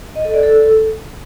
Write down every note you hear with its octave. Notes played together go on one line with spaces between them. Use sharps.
D#5
A4
D5
A4